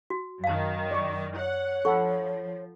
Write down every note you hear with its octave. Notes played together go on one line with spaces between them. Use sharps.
F#4
F#2 D#3 F5 A5
D5 C#6
C#5 F#5
F3 A4 F#5 B5 C#6